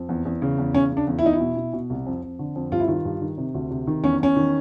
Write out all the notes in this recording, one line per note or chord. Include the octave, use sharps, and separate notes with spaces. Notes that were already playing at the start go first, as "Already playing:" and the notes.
Already playing: F2
E2
E2
C#3
E2
C#3 C#4
C#3
D4
E2
E4
E2 D#4
E4
B2
B2
B2
C2
F2
F2
D3
F2
G2 F4
E4
D#3 F4
G2
D#3
C3
D2
C3
D#3
E2 C#4
E2 C#4
D#3